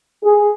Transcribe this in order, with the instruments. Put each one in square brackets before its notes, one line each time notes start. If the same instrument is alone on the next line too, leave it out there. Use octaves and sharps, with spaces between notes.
[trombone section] G#4